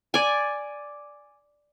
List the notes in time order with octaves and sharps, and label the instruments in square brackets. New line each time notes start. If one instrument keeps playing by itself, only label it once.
[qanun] D5 G#5